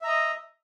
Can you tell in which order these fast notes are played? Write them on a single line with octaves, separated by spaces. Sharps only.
E5 A#5 D#5